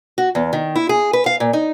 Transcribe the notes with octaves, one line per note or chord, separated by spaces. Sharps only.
F#4
E2
D#3
E4
G#4
B4
F5
A#2
D#4